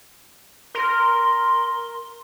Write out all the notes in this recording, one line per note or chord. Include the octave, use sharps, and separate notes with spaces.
A#4 C6